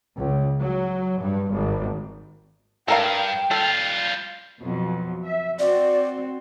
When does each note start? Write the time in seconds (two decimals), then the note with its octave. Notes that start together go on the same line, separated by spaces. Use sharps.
0.17 C#2
0.60 F#3
1.19 G2
1.51 G#1
2.88 G2 A4 A#4 F5 G5
3.51 G3 F4 A4
4.61 F2 B2 F#3
5.24 E5
5.59 C4 F#4 D5